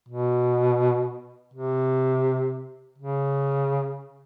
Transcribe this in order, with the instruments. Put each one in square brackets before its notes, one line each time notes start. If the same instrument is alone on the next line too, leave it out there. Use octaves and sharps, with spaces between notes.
[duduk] B2
C3
C#3